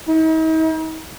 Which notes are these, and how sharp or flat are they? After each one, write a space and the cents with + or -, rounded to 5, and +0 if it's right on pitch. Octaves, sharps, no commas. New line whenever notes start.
D#4 +45